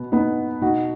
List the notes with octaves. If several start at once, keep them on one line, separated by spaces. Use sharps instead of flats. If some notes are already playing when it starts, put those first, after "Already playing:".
Already playing: B2 B3
B3 D#4
B2 D#4 F#4